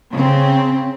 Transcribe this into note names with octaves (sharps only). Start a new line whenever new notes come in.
C#3 C4